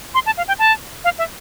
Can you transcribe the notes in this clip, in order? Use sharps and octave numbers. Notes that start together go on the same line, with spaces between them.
C6
A5
F5
G5
A5
F5
E5